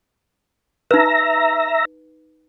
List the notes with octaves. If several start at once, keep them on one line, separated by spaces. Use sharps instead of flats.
D#4 B4 E5 A#5